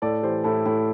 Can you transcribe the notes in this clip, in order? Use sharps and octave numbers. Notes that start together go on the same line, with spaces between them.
A2 A4 D5
E3 G4 C5
A2 E4 A4
A2 E4